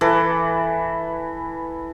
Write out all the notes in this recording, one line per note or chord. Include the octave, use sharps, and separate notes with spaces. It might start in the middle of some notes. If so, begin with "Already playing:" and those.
E3 A4 B4